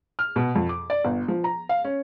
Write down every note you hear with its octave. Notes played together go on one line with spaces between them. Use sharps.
F6
B2
F2
D6
D5
G1
F3
A#5
F5
C#4